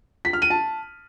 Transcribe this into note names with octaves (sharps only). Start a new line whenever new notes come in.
B6
F6
D#7
A5